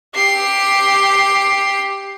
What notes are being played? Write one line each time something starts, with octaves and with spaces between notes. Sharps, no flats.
G4 C7